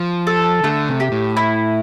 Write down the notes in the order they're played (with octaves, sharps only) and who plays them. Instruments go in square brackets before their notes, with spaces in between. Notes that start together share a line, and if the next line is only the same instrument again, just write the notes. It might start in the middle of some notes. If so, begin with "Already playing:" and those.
Already playing: [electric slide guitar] F3
[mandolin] A4
[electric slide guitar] D3 [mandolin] A3
[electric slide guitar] C3
[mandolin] G4
[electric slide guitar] A2
[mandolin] E4